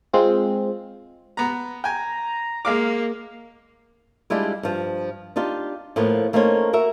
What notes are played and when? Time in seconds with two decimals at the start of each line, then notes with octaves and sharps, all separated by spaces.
0.13 G#3 C4 F4
1.37 B3 A#5
1.84 G5 G#5 A#5
2.65 G#3 A#3 F5 D6
4.30 G3 G#3 D4 E4 F4
4.63 G2 F3
5.36 D4 D#4 F4 G4
5.96 A2 F3 A#3 B3
6.33 A3 A#3 C#4 D#4 C5 C#5
6.73 F#4 A#4 E5